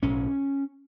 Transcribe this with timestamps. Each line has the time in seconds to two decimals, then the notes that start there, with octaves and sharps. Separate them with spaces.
0.02 B1 A2 C#4